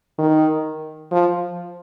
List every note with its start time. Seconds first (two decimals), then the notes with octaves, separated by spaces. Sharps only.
0.19 D#3
1.12 F3